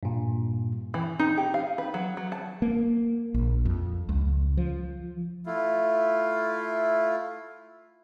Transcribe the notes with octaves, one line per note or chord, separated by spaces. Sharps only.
G2 A#2
E3
D#4
G4
F5
B4
F#3
F#3
A5
A#3
A#1
F2
C#2
F3
A3 E4 F4